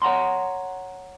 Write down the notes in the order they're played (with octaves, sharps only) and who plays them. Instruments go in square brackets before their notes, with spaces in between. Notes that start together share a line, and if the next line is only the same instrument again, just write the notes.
[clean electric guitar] C#5 F#5 A#5 C6